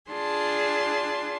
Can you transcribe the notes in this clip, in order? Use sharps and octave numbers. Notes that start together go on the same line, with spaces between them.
D4 F4 G#4 A5 C6